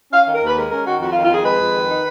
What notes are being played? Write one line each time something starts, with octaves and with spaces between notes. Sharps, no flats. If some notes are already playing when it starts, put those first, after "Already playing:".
C#4 F5
D#3 F5
A#4
D#2 B4
G#3 A#4
C#4 A#4
D#3 F#4
F2 F#4
F4
D#3
F4
F2 G#4
G#3 B4
F2
D#3
D#4